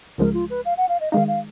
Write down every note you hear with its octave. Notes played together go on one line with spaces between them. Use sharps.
C#2 C#3 F3 G#3 A#4
F4
B4
F5
F#5
F5
D#5
D#3 G#3 D#4 F5
F5